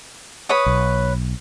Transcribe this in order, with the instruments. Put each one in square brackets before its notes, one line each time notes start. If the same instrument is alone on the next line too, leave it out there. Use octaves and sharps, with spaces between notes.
[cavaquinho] B4 C#5 D#6
[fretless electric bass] B1